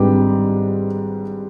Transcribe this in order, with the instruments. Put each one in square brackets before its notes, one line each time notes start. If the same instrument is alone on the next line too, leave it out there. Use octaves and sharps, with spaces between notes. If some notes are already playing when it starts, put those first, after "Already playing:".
Already playing: [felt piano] G#1 G#2 G3 D4 G4 B4